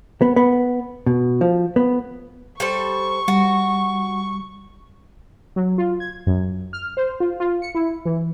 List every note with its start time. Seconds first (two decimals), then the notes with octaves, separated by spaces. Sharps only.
0.22 B3
0.36 B3
1.06 B2
1.41 F3
1.76 B3
2.60 G3 A4 C5 C#6
3.28 G3 F#4
5.56 F#3
5.78 F4
6.00 G#6
6.27 F#2
6.73 F6
6.97 C5
7.20 F4
7.40 F4
7.62 C#7
7.75 E4
8.05 E3